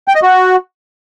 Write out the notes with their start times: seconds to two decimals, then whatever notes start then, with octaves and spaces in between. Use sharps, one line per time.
0.08 G5
0.15 D#5
0.23 F#4